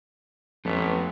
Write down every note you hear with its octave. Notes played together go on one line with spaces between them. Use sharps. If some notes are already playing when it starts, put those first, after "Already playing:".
A1 F2 B3